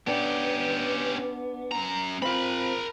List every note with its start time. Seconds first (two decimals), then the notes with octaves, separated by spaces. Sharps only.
0.07 B3 C#4 D4 G4
1.71 F#2 A#5
2.22 C4 F4 A#4 B5